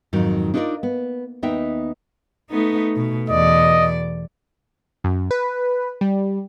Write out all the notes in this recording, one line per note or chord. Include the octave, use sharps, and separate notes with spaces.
F2 G#2 D#3 F#3
D4 D#4 F4 A4 A#4 D5
B3
D#2 B3 D#4 E5 G5
A3 B3 D#4
B2
E2 B2 D5 D#5
F#2
B4
G3